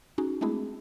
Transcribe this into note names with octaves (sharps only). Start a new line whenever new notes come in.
C#4 D#4 F#4 G#4
G#3 A3 C4 D4 E4 G#4